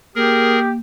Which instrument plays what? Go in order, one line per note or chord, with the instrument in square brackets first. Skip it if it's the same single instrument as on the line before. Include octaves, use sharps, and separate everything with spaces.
[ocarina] A#3 [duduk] G4 [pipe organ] G#4 A#4